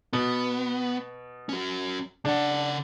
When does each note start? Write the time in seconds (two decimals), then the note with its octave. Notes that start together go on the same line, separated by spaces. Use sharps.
0.13 B2 B3
1.49 C#4 F#4
2.25 C#3 D4 F#5